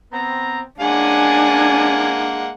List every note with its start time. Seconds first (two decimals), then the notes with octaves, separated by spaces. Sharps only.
0.12 B3 C4 A#5
0.80 G#3 A#3 C#4 D4 F#5 G#5